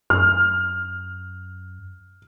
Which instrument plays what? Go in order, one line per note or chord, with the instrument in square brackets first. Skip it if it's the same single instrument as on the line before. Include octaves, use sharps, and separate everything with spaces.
[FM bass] F#2 [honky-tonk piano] F6